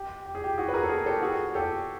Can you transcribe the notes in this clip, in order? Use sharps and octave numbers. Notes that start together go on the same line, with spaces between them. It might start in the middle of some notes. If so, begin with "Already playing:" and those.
Already playing: G4
G4
G#4
G4
F#4 G#4
B4
G#4 A#4
A4
G#4 A#4
G4 A4
F#4 G#4
G4 A4